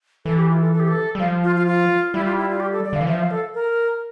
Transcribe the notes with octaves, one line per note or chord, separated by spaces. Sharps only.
E3 A4
G4
F4
A4
A4
G4
A4
G3
F3 F5
F4
F4
F4
G3 E4
F4
E4
F4
G4
A4
D5
D3
F5
E3
F3 E5
F5
A4
A#4